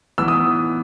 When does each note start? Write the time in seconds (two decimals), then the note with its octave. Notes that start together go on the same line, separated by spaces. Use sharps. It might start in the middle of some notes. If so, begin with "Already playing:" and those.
0.18 E3 B3 E6
0.28 D#6